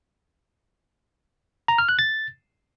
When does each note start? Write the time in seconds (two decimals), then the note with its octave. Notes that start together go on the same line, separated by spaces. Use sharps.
1.68 A#5
1.78 F6
1.89 F#6
1.99 A6